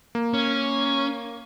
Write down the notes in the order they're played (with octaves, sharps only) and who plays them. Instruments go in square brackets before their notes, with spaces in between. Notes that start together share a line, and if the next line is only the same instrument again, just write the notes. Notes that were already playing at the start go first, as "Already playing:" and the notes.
[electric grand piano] A#3
[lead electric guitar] C#4